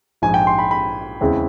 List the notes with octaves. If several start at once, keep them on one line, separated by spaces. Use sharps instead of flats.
A#1 G#2 F3 G#5
G5
C6
B5
B5
E2 C#3 E3 G#3 C4